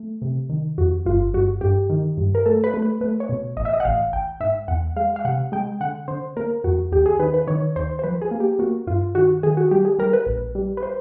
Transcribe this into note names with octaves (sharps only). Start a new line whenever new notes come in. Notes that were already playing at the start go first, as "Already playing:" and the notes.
Already playing: A3
C3
D#3
F2 F#4
G1 F4
G2 F#4
G2 G4
D#3
G2
A#4
A3 A4
B4
A3
B4
A3 B4
C#5
B2
A1 D#5
E5
D#5
F#5
A1 F5
A1 G5
G#2 E5
E2 F#5
G#3 F5
F5
C3 F#5
G#3 G5
D3 F#5
D3 C5
A#3 A#4
F2 F#4
D#2 G4
G#4
D#3 B4
B4
D#3 C#5
D#2 C5
C5
F3 B4
G#4
A#3
G4
A#3 F#4
G2 F4
D#3 F#4
D#3 G#4
F#4
G3 G4
G#4
G3 A#4
B4
A#1
G3
B4
C5